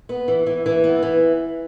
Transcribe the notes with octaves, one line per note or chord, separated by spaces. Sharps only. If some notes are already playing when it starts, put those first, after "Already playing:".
B3
E3
E3
E3
B3
E3